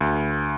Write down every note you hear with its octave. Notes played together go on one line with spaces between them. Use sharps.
D2